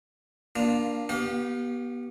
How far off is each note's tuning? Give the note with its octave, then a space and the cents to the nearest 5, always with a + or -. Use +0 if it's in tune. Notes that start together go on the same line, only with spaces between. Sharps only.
A#3 +15 D4 +0 F4 +0
B3 -30 G4 -25 F5 +30